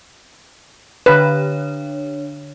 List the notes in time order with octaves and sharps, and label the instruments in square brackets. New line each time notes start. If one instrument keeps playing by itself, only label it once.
[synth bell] D3 D4 C#5 [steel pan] B4